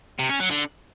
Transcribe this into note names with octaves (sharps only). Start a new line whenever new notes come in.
C3
C#4
F#3
D3